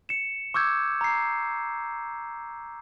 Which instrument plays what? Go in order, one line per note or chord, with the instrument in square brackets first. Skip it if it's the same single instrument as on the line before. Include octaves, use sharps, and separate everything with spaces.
[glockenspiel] C#7 E7
C#6 D6 E6 G6 G#6
A#5 C7